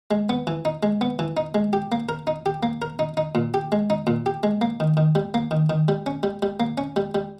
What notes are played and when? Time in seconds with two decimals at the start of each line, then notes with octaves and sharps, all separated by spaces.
0.11 G#3
0.29 B3
0.47 E3
0.65 D#4
0.83 G#3
1.01 B3
1.19 E3
1.37 D#4
1.55 G#3
1.73 G4
1.92 A#3
2.09 A#4
2.27 D#4
2.46 G4
2.63 A#3
2.82 A#4
2.99 D#4
3.17 D#4
3.35 A#2
3.54 G4
3.72 G#3
3.90 D#4
4.07 A#2
4.26 G4
4.43 G#3
4.61 A#3
4.80 D#3
4.97 D#3
5.15 G3
5.34 A#3
5.51 D#3
5.70 D#3
5.88 G3
6.06 C#4
6.23 G3
6.42 G3
6.60 A#3
6.78 C#4
6.96 G3
7.15 G3